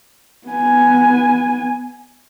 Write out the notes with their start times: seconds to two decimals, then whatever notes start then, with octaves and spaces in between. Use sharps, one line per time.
0.48 B3 G#5